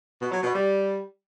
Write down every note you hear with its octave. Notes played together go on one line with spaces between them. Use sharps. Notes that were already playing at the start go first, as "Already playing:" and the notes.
B2
F#3
B2
G3